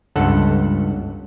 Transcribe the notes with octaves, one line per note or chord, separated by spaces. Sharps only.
C#2 G2 A4 F#5